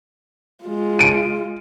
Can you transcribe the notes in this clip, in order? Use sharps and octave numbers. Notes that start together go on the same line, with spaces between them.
G#3 F4
D7 D#7